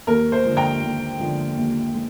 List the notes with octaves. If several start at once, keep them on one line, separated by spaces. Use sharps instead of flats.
D#2 A#4
C5
D3 F3 G#3
G5 A#5
D#2
D3 F3 G#3
D#2
G#3